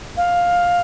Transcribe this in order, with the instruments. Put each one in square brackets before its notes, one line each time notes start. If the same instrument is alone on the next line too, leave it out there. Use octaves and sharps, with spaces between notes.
[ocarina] F5